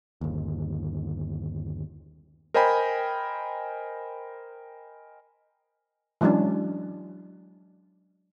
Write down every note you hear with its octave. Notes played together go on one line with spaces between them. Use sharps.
G1 D#2
A#4 C5 D#5 G5 G#5 B5
E3 F#3 G#3 C#4 D4